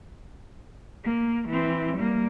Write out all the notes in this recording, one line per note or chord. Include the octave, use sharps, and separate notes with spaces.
A#3
E3 C4
G3 A#3